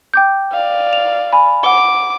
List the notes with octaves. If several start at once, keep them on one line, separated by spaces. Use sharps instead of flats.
G5 D6 G6
D5 F5
F7
G#5 B5
F#5 D6 G7